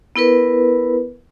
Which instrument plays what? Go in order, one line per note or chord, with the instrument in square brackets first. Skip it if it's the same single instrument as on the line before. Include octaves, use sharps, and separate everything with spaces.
[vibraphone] B3 E4 A#4 B4